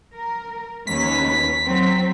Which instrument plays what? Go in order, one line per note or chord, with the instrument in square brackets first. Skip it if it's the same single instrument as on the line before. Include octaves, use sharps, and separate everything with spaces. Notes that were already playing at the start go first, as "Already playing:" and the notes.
[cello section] A#4
[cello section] D#2 C#4 B4 [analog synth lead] B6
[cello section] F#3 C4